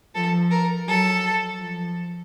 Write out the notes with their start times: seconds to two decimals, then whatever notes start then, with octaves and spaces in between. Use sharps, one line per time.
0.15 F3 A4
0.51 A#4
0.87 F#3 A4
1.60 F3